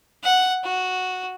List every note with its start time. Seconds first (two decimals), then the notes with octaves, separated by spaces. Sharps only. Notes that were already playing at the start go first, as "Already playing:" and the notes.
0.23 F#5
0.64 F#4